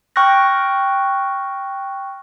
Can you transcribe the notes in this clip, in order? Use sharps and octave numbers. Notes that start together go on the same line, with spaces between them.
G5 C#6 F6 F#6 A#6